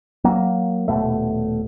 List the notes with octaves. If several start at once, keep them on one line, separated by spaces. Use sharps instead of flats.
F#3 A#3
D#1 C2 B2 A3